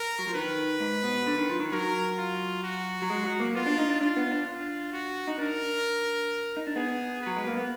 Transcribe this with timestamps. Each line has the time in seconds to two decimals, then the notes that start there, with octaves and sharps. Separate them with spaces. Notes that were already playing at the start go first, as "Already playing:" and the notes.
Already playing: A#4
0.19 F#3
0.27 F3
0.34 D#3 B4
0.80 G#2
1.03 B2
1.26 D3
1.38 D#3
1.49 F3
1.60 D#3
1.72 F#3 A#4
2.18 F4
2.64 F#4
3.02 F#3
3.10 G#3
3.24 F#3
3.40 A#3
3.55 B3 F4
3.66 D4
3.78 D#4
3.89 D4
4.01 D4 F4
4.17 B3
4.32 D4
4.47 F4
4.93 F#4
5.27 D#4
5.38 D4 A#4
6.57 D#4
6.67 D4
6.76 B3 G#4
7.21 F#3 B4
7.36 G#3
7.47 A#3
7.57 B3